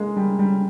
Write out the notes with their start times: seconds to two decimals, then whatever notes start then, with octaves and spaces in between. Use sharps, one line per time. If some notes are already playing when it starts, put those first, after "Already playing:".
Already playing: G#3 A#3
0.17 G3
0.39 G3